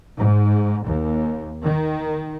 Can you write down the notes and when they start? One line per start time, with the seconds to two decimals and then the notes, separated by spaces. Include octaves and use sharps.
0.17 G#2
0.85 D#2
1.64 D#3